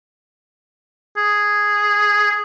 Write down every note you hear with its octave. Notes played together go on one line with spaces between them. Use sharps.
G#4